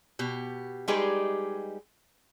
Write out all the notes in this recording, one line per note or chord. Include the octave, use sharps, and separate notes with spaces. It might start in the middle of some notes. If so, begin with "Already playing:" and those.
B2 G4
G3 G#3 D#4 G4 G#4 B4